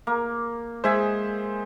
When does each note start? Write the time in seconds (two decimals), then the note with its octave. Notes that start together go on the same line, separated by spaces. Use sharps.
0.07 A#3
0.84 G#3 G#4 C5 E5 G#5